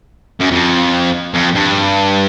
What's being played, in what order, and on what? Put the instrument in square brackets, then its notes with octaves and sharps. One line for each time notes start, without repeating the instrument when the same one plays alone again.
[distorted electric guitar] F#2
F2
F2
G2